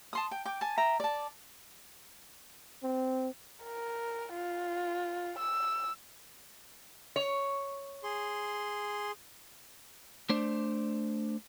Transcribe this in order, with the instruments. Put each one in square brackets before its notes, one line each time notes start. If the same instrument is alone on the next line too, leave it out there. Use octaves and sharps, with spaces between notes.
[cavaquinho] A5 C6 D#6
G5
G5 D6
G#5 A5
E5 G5 A#5
D5 A5
[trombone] C4
[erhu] A#4
F4
E6
[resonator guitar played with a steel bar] C#5
[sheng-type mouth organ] G#4 C6
[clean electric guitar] A3 D4 C5 D5